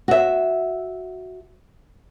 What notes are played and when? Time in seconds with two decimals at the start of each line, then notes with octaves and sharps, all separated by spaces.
0.08 F#4 E5